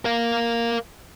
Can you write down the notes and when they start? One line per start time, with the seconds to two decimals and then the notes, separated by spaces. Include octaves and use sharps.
0.05 A#4 F5